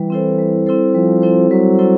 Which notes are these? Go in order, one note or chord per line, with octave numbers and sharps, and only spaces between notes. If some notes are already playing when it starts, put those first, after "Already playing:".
Already playing: E3 G3
C4 E4 A4 C5
G3
C4 E4 A4 C5
F3 G3
C4 E4 A4 C5
F#3 G3
C4 E4 A4 C5